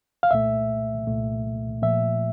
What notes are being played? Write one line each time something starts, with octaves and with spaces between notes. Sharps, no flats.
F5
C2 A#2 A3 E5
C2 A#2 A3
A#2 F3 A3 E5